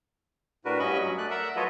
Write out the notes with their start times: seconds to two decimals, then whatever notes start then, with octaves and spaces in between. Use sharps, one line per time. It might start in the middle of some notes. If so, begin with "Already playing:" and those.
0.65 A2 D4 F#4 A#4 B4
0.79 G2 C#4 D#5 B5 C#6
1.00 F#3
1.18 A3 D5 F#6
1.30 A#4 E5 F#5
1.56 F#3 F4 A4 B4 C#5 D#5